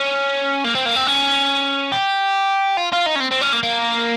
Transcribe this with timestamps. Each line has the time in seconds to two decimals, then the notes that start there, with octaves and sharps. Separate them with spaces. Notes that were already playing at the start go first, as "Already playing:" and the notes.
Already playing: C#4
0.64 A#3
0.75 C4
0.86 A#3
0.96 C4
1.07 C#4
1.92 G4
2.77 F4
2.92 F4
3.06 D#4
3.15 C#4
3.20 C4
3.31 C4
3.41 C#4
3.53 A#3
3.63 A#3